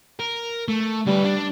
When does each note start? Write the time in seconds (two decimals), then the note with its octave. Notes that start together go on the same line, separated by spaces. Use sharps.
0.20 A#4
0.68 A3
1.07 D3 G3 B4
1.25 D4